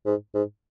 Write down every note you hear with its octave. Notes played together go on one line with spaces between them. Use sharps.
G#2
G#2